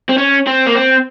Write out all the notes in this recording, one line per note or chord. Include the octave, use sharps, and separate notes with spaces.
C4
C#4
C4
A#3
C4